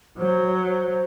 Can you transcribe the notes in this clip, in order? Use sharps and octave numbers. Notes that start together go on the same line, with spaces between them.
F#3 C5
C#5
C5